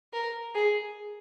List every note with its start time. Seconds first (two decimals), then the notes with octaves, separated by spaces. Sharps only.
0.13 A#4
0.55 G#4